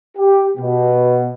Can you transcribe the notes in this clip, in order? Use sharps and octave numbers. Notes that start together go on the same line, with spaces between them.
G4
B2